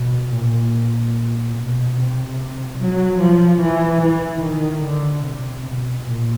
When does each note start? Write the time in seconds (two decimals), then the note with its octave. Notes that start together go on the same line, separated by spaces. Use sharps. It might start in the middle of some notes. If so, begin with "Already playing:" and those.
Already playing: B2
0.32 A#2
0.73 A#2
1.56 B2
1.97 C3
2.79 F#3
3.20 F3
3.61 E3
4.01 E3
4.43 D#3
4.83 D3
5.25 C3
5.65 B2
6.07 A#2